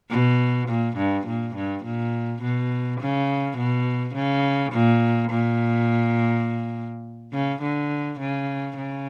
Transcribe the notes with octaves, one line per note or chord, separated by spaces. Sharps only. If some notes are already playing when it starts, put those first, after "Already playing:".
B2
A#2
G2
A#2
G2
A#2
B2
C#3
B2
C#3
A#2
A#2
C#3
D3
C#3
C#3